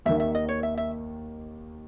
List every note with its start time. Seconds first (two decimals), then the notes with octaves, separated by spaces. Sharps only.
0.06 D#2 D#3 A#3 E5
0.20 E5
0.35 D#5
0.49 C#5
0.63 E5
0.78 E5